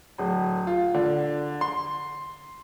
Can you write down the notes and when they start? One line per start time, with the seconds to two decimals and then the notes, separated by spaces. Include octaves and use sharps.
0.18 D1
0.67 F4
0.94 D3
1.61 C6